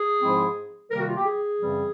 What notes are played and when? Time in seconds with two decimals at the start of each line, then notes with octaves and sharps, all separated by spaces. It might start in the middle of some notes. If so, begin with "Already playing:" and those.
Already playing: G#4
0.22 G#2 F3 G#3 C4 E4
0.91 C3 D#3 G3 A#3 A#4
0.99 F#4
1.09 F4
1.17 G4
1.26 G#4
1.60 F#2 C#3 E3 G3 C4